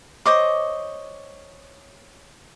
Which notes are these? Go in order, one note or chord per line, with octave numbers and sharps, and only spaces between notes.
C5 C#5 D#5 D6